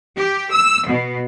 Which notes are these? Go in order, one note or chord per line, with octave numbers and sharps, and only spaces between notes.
G4
E6
B2